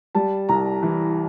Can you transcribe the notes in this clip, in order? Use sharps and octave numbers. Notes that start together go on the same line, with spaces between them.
G3 A5
C2 A#5
E3